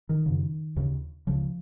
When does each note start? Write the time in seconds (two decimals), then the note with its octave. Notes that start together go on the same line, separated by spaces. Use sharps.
0.09 D#3
0.26 F#2 C#3
0.76 D#2 C#3
1.27 C#2 C#3 F3